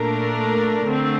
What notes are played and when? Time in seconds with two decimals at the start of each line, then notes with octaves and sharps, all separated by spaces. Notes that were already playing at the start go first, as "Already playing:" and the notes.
Already playing: A#2 A3 D4 A#4
0.87 D3 A3 C4